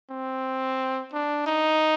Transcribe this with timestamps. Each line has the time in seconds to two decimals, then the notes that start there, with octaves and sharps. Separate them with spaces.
0.10 C4
1.13 D4
1.46 D#4